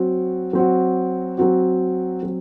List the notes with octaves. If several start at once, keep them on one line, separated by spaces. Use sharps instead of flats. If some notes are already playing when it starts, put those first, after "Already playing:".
Already playing: F#3 C4 F#4
F#3 C4 F#4
F#3 C4 F#4
F#3 C4